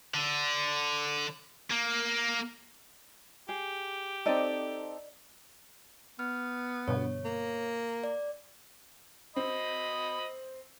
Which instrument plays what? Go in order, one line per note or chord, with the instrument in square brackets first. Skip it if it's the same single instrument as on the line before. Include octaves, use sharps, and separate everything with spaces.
[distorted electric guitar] D3
A#3
[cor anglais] G4 [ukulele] G#4
[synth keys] C4 D#4 A4 [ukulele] D5 D#5
[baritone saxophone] B3 [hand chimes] F6
[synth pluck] G2 B2 D3 [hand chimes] C#5
[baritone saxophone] A#3
[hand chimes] D5
[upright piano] C4 [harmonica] D#5 B5